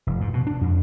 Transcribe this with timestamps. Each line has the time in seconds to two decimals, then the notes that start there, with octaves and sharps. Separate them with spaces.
0.07 F1
0.21 G#2
0.33 B2
0.47 D4
0.61 F2